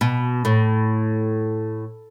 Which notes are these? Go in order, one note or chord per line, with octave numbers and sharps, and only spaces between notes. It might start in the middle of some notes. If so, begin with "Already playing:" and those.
B2
A2